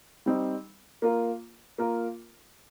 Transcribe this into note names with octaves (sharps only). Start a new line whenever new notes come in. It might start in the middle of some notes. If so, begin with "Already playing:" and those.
G3 C4 D#4
A#3 F4 A#4
A#3 F4 A#4